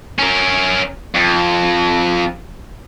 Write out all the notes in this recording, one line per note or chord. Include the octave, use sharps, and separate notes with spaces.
C#4 A#4
F2